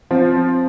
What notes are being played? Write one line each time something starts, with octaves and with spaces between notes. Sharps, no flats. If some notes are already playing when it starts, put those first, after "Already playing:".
F3 C4